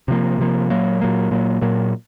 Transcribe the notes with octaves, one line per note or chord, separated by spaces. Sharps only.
C3 F3 A#3
C3 F3 A#3
A#2 F#3 A#3
A#2 F#3 A#3
A#2 F#3 A#3
A#2 F#3 A#3